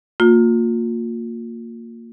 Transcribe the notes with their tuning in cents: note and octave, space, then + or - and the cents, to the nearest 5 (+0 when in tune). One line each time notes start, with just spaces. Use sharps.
A#3 -20 F4 +35